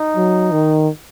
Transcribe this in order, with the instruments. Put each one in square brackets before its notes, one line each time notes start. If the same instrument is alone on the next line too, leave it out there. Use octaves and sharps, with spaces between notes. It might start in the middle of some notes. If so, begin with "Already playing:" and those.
Already playing: [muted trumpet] D#4
[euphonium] F#3
D#3